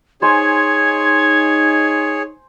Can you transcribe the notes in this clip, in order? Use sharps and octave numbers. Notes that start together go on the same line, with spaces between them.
D#4 G#4 C5 C#5 G#5 C6 G#6